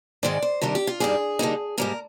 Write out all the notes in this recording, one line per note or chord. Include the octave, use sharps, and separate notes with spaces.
G#2 D#3 G#3 D5
C5
C3 D#3 G3 D4 A#4
G4
F4
G2 D#3 G3 G#4
D3 G3 A#3 D#4
G#2 G3 A#3 A#4